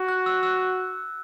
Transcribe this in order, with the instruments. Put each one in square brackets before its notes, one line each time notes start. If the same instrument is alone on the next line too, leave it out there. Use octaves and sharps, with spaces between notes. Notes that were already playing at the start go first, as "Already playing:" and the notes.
Already playing: [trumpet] F#4
[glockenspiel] F#6
E6
E6